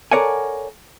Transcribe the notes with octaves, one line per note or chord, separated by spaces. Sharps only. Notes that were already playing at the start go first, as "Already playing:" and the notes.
A4 A#4 C#5 D5 F#5 G#5